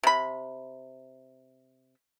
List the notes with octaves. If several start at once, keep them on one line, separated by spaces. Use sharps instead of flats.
C3 B5